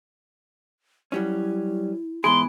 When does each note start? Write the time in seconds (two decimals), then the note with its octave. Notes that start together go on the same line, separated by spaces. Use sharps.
1.12 F#3 G3 C#4 E4
2.24 G#2 E3 B3 G#4 C6